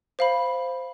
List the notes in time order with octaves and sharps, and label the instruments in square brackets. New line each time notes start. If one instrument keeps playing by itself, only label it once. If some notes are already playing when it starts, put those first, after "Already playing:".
[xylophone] C5 F5 B5